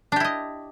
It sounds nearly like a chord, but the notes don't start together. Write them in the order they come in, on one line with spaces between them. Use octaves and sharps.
D4 G4 E4 D#5